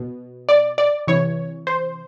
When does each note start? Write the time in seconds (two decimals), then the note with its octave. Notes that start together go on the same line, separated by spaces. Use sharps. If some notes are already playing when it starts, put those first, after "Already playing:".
Already playing: B2
0.49 D5
0.78 D5
1.08 C3 E3 C#5
1.67 C5